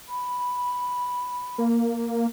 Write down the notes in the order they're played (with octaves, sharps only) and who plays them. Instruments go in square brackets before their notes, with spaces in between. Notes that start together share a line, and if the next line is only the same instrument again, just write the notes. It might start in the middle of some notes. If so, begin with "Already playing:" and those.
[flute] B5
[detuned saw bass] A#3